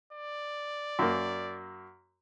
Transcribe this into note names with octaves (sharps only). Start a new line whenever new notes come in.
D5
F#2 A#3